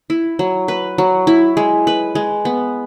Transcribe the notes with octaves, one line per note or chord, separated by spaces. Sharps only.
E4
F#3
B4
F#3
E4
G#3
B4
G#3
B3